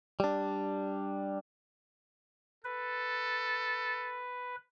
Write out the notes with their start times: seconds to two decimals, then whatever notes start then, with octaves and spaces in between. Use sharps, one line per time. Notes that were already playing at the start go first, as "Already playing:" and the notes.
0.20 G3 D4
2.64 A4 B4